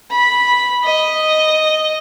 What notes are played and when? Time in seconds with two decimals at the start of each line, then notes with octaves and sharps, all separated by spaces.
0.11 B5
0.84 D#5